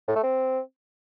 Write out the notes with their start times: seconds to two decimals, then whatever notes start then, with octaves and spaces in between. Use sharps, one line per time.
0.08 A2
0.15 A3
0.23 C4